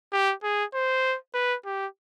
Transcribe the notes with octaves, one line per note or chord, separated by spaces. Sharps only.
G4
G#4
C5
B4
G4